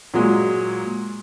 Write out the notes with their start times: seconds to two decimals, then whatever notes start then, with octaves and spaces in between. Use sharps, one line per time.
0.14 A#2 F#3 G#3